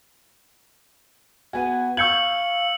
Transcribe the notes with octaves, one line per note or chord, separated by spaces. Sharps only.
B3 F#4 G#5
F5 C#6 E6 G6 G#6 C#7 F#7